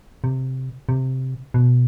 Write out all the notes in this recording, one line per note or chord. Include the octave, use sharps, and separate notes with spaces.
C3
C3
B2